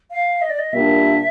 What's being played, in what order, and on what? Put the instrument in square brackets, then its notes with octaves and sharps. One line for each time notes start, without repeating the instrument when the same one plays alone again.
[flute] F5
D#5
D5
D#5
[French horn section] A#2 G3 A#3 D4 [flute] E5